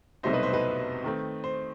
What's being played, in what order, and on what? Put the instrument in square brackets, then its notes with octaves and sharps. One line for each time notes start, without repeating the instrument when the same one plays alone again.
[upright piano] C2 B2 F#3 A3 D#4 [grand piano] C5 E5
[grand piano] B4 D#5
C5 E5
B4 D#5
[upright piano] D#3 A3 C4
[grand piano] C5